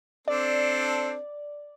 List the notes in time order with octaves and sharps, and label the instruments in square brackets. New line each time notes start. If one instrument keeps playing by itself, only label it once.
[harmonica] C4 D4 A4 [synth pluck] D5